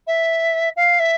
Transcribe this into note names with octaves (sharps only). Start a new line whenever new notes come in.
E5
F5
E5